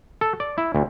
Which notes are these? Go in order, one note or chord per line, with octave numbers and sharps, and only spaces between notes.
A4
D5
E4
D2